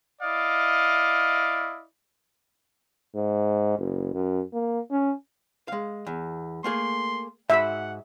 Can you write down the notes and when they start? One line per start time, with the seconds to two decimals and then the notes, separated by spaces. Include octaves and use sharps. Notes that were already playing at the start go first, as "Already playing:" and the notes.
0.22 E4 D5 D#5 F5
3.15 G#2
3.79 F#1
4.14 F#2
4.53 A#3
4.91 C#4
5.68 G#3 F5
6.07 E2
6.64 A3 A#3 G#4 C6
7.50 G#2 F#4 E5 F#5 B5